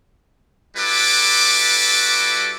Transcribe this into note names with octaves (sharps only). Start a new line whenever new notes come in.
G3 E4 F#4 A4 B4 D6